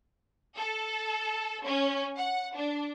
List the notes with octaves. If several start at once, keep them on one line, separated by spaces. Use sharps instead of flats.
A4
C#4
F#5
D4